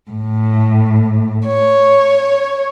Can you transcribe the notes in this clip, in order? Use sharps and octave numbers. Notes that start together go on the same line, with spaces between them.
A2
C#5